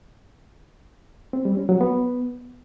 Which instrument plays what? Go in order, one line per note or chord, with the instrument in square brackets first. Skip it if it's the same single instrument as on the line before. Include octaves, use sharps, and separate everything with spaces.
[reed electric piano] C4
G3
C#4
F#3
B3